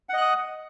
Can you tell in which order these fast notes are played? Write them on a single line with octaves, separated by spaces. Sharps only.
F#5 D#5 F#6 D#6